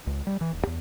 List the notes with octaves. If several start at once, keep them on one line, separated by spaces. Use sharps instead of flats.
C#2
G3
E3
D#1
E2